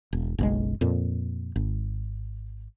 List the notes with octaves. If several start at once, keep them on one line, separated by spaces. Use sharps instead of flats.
E1
F#1 B1 G#3
F2 A#2
G#1